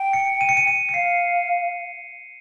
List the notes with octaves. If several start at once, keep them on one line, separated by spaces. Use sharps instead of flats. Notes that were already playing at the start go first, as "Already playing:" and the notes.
Already playing: G5
C#7
D#7
C#7
D#7
C#7
C#7
F5 C7